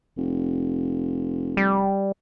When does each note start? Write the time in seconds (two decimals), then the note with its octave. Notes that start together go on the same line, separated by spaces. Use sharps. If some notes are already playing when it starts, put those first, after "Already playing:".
0.17 F1
1.57 G3